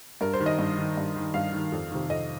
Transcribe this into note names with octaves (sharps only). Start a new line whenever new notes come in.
G2 A#4
C5
D#3
D#5
G2
D#3
G2
D#3
G2 F5
D#3
F2
C3 D#3
F2 D#5